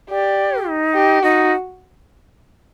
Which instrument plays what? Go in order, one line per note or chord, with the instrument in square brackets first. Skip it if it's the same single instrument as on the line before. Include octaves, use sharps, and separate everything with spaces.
[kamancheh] G4 [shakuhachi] D5
[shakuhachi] D#4
[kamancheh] G4
[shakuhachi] D#4 [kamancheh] F#4